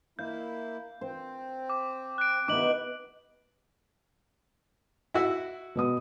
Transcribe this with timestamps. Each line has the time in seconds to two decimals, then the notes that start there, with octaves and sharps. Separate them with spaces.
0.19 A#3 E4 F5 G6
1.01 C4 C5
1.70 D6
2.18 F#6 D7
2.48 C3 D#3 B3 D#4 E4 D6 F#7
5.14 E4 F#4 E5
5.75 B2 B3 D#6